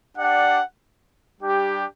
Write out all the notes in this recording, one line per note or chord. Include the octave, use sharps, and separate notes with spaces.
D4 G4 D5 F#5
G3 D4 G4